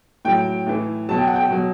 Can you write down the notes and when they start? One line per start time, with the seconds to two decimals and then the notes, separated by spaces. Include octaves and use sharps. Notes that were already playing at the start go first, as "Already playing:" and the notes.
0.25 A2 F#3 G5
0.66 A2 E3
1.09 B2 F#3 A5
1.18 G5
1.27 F#5
1.36 G5
1.51 B2 F#3